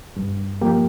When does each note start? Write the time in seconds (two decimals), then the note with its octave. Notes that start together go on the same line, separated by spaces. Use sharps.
0.16 G2
0.61 F3 A#3 G4